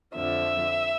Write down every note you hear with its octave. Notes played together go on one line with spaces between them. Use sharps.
F2 D3 F3 E5